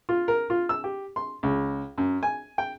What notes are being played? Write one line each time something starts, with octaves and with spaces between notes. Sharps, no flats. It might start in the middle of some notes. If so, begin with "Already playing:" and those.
F4
A#4
F4
E6
G4
C6
C#2
F#2
G#5
G5